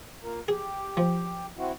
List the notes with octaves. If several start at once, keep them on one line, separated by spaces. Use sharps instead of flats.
A#3 F4 A#4
G4 G#4
F3
C4 E4 F#4